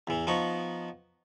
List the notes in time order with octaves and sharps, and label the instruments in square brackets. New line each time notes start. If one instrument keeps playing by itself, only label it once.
[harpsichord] E2 E3
F3 B3 D#4 C#6